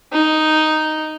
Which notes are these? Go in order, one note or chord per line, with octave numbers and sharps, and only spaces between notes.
D#4